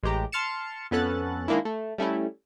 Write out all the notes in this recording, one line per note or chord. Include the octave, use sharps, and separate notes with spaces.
A1 G#3 G4 A#5
A5 C6 F6 A6 C#7 E7
F2 B3 C#4 A4 F#6 A6
D#3 G#3 A#3 D4 E4
A3
G3 A3 C#4 E4